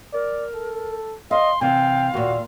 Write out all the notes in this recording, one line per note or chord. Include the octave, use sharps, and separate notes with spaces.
A#4 D5
A4
D#5 F5 C6
C3 E3 F5 G5
D#2 A#2 F#4